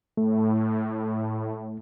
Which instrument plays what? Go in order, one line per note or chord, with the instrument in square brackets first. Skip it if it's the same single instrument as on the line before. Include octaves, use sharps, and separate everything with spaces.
[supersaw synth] A2 [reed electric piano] A3